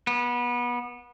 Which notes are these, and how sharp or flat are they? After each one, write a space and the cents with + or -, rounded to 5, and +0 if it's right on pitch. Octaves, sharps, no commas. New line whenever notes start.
B3 -25